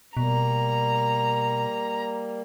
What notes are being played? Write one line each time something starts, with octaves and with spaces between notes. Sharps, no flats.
B2 G3 A#3 A#5